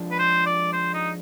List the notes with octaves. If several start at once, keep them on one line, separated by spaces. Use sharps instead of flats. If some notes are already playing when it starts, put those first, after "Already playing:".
Already playing: F3 G#3 D4
B4
C5
D5
C5
D#4